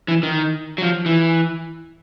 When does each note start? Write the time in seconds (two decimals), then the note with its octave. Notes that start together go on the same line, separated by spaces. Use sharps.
0.08 E3
0.23 D#3
0.78 F#3
0.83 F3
1.06 E3